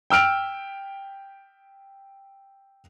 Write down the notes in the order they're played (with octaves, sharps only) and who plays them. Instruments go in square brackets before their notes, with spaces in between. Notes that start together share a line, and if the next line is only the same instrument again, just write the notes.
[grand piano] G5 E6 F6 D7 F7